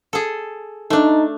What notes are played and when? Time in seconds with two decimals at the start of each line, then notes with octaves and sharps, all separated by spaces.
0.13 G#4 A4
0.90 A3 D4 D#4